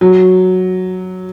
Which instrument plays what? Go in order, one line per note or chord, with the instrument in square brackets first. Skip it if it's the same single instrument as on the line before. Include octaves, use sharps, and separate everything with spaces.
[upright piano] F#3